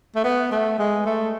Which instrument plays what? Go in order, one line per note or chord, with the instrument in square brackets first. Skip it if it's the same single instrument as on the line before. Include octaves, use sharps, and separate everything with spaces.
[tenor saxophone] A3
B3
A3
G#3
A3